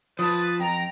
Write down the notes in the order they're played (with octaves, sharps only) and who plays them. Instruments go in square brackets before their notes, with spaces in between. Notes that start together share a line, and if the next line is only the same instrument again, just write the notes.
[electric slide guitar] F3 [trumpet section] B4 A5 [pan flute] D#6
[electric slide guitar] F2 [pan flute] G5 [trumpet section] A#5